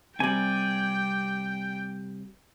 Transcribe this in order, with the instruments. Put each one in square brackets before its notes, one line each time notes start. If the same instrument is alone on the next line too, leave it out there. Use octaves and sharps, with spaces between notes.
[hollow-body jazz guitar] C3 G3 [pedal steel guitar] D5 G#5 [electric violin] G5